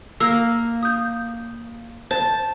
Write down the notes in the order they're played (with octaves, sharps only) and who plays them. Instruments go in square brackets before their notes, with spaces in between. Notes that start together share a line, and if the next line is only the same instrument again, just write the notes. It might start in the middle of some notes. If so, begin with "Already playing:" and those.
[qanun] A#3 [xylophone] E6
[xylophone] D#6 G6
[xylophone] C5 [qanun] A5